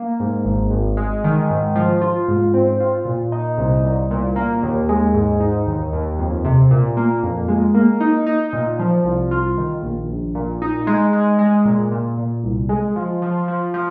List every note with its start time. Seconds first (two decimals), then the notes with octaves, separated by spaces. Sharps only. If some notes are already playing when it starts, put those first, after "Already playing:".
Already playing: A#3
0.20 G#2
0.45 G#1
0.71 G#1
0.97 G#3
1.24 D#3
1.50 G#2
1.76 F3
2.01 F4
2.28 G#2
2.54 C4
2.80 F4
3.05 A#2
3.32 D#4
3.57 C2
3.84 C2
4.11 A#2
4.36 A#3
4.63 D#2
4.89 G#3
5.15 G#2
5.40 D#4
5.67 D#2
5.93 D#2
6.19 F2
6.45 C3
6.71 A#2
6.97 A#3
7.23 F2
7.48 G#3
7.74 A#3
8.00 D#4
8.27 D#4
8.53 A#2
8.79 F3
9.04 C2
9.31 F4
9.58 D#3
9.82 A#1
10.10 A#1
10.35 A#2
10.62 D#4
10.87 G#3
11.13 G#3
11.39 G#3
11.65 A#2
11.92 A#2
12.18 A#2
12.44 C2
12.69 G#3
12.96 F3
13.22 F3
13.48 F3
13.74 F3